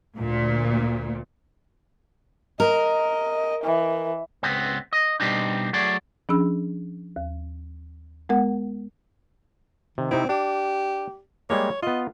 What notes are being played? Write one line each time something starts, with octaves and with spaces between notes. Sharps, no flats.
D2 A#2
A#4 D#5
E3
C#2 B3 C4
D#5
B2 G3 C4 D4 D#4
F#3 A3 G#4 D5
F3 C#4 D4 G#4 B5 E6
D#2
G#3 B3 A#4 F#5
C3 D#3
C3 C4 D#4 E4
D4 G4
G3 G#3 A#3 C#5
B3 F4 D#5